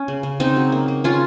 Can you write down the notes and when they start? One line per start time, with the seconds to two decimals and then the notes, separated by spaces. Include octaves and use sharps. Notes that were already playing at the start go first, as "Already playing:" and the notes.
Already playing: C#4
0.08 C#3
0.23 C#3
0.40 C#3 C4 D#4
0.56 F#3
0.72 A#3
0.88 A#3
1.04 C#3 C#4 F4